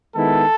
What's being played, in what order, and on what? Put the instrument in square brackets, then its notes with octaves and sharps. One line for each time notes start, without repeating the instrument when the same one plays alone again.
[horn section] D#3 G#3 B3 E4 A4